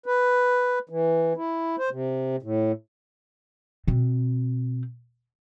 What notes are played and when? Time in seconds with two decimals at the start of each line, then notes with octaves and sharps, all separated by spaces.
0.06 B4
0.89 E3
1.36 E4
1.79 C5
1.91 C3
2.42 A2
3.88 B2 C4